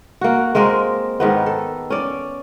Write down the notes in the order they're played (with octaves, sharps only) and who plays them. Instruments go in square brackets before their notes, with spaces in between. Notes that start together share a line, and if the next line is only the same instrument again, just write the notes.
[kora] A#3 F#4
G#3 A#3 C4 A#4
G#2 D#3 B3
A4
C#4 D5